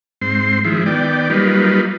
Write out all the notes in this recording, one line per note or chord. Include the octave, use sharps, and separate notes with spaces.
G#2 C4 C6
D#3 F3 G#3 E4
D#3 B3 D5 G5
F#3 G3 A#3 D#4 F4 B4